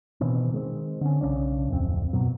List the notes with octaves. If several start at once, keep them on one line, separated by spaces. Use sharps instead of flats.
B2 D#3 E3 C4
D#3 G#3 C4
D3 C#4
B1 C#3 C#4 D4
D1 F2 C4
F#2 B2 F#3